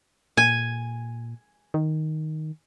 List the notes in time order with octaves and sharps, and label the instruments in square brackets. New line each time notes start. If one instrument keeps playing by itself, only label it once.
[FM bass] A#2 [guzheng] G#5
[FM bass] D#3